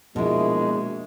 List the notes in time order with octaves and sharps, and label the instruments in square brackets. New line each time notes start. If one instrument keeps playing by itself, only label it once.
[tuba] A#1 [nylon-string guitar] B2 E4 [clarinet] G#3 [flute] G#4